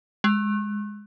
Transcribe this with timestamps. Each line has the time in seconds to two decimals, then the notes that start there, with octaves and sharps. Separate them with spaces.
0.24 G#3